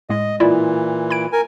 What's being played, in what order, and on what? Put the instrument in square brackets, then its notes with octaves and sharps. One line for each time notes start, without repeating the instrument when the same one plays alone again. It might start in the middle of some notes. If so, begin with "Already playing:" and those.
[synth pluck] A2 G#3 [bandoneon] D#5
[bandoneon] A#2 E3 [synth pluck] E4 F4 D5
[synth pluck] B5 G#6 D7
[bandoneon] A#4 G#5